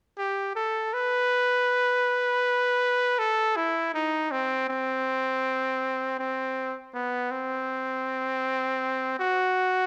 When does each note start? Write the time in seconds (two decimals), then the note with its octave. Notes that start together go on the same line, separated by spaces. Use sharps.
0.18 G4
0.55 A4
0.94 B4
3.19 A4
3.56 E4
3.94 D#4
4.31 C4
4.69 C4
6.19 C4
6.94 B3
7.31 C4
9.19 F#4